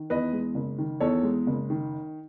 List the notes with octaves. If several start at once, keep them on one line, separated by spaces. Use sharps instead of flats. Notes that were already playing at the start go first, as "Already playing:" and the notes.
Already playing: D#3
E2 B4 D#5
G#3
F#1
D#3
E2 A4 C#5
G#3
F#1
D#3